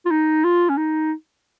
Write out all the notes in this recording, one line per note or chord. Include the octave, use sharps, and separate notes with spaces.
F4
D#4
F4
C#4
D#4